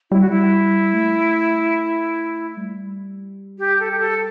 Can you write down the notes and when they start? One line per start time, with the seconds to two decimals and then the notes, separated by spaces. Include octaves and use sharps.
0.11 G3 E4
0.21 F#4
0.30 E4
0.93 A3
2.57 G3
3.59 G4
3.80 A4
3.91 G4
4.00 A4